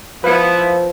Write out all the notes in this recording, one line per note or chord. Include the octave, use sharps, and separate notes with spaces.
F3 B3 E4 B4 F5